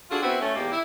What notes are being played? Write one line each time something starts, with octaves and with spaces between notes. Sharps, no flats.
D4 F4 F#4 G#4 A4
B3 C4 E4 F#4 C5
A3 C#4
E2 G#2 A#3 G4
E4